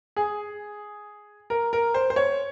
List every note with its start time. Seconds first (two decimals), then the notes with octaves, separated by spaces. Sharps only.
0.16 G#4
1.50 A#4
1.73 A#4
1.94 C5
2.10 C5
2.16 C#5